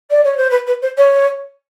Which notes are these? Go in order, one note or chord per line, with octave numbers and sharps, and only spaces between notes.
D5
C#5
C5
B4
B4
C5
C#5